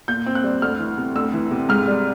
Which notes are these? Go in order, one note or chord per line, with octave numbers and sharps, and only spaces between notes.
A#2 G6
C4
F#6
G3
D2 F6
E3
C3
D2 E6
E3
C3
G#2 F6
G3